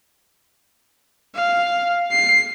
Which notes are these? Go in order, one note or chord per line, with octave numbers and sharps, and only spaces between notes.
F5
C7